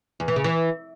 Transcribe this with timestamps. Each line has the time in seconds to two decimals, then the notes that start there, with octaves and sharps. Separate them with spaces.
0.20 E2
0.28 E3
0.36 C#3
0.44 E3